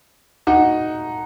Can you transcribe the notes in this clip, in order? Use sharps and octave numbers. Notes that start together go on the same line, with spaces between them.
D#4 F#4